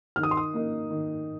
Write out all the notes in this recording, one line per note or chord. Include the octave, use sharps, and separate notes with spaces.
D#3 F6
D#6
C6
D#6
A#3 D#4
D#3